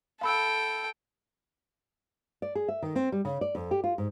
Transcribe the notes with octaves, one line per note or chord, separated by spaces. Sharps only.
A4 F5 G5 B5 E6
D5
G#4
E5
D#3
C4
G3
C#3
D5
F2
G4
F4
G#2